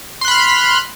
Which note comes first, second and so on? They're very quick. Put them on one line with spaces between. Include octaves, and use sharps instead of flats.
C6 F#6 B5 F6